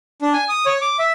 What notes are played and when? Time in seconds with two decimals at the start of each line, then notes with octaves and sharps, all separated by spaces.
0.22 D4
0.33 G#5
0.49 D#6
0.66 C#5
0.81 D6
0.99 E5